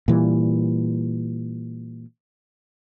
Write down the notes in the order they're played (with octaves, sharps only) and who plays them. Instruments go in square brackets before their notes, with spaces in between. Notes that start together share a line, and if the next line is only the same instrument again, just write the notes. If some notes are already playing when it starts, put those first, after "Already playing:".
[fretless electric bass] A#2 E3 G3